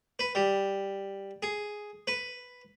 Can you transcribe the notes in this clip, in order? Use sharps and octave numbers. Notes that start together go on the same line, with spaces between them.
B4
G3
G#4
B4